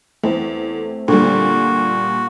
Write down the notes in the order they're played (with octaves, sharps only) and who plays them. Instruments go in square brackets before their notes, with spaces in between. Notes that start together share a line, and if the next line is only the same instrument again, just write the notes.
[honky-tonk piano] E2 [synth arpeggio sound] A3 C4
[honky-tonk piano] A#2 G3 [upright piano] D3 [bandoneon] F#4